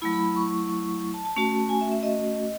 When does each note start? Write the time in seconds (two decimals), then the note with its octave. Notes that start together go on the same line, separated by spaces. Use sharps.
0.01 F#3 A3 E4 B5
0.13 B5
0.24 B5
0.36 C#6
1.14 A5
1.25 A5
1.36 A3 C#4 F#4
1.69 G#5
1.81 E5
1.92 E5
2.03 D#5